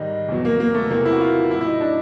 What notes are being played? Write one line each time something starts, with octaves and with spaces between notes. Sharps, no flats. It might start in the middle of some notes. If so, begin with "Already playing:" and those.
Already playing: G#2 D#3 G3 D#4
E2 B2 F#3
A#3
A#3
A3
E2 C3 E3 A#3
E4
F#4
F4
A2 F#3 E4
E4
D#4
D4